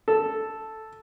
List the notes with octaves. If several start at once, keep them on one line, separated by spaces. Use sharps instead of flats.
A4